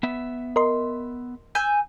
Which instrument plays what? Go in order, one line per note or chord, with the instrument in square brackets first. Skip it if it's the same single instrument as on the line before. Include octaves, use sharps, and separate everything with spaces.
[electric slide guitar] B3 E5
[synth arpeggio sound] A#4 D#5 C6
[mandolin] G#5 E6 G6